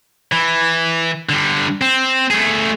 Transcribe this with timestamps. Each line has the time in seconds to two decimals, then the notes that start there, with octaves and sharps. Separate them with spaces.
0.32 E3
1.29 D3 G3
1.81 C4
2.31 A3 G#4